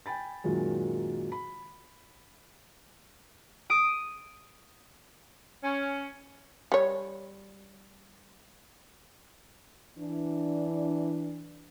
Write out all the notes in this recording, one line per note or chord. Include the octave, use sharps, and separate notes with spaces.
G5 G#5 B5 A6
F#2 A#2 D#3 F#3 G#3
B5
D#6 D7 D#7
C#4
G3 C#5
E3 D4